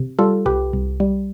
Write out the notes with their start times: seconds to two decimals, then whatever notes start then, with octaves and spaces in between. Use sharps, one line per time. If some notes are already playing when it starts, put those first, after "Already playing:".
Already playing: C3
0.19 G3 F4 A4
0.46 C2 G4 B4
0.73 C2
1.00 G3